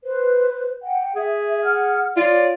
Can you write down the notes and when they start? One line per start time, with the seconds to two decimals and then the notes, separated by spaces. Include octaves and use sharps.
0.04 B4 C5
0.82 F#5 G5
1.15 G#4 E5
1.63 F#5 F6
2.16 F4 C#5 D5